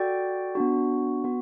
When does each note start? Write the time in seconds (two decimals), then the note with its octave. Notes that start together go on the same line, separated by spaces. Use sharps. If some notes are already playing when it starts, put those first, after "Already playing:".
Already playing: F#4 A4 D5 G5
0.55 B3 D4 F#4
1.24 B3 F#4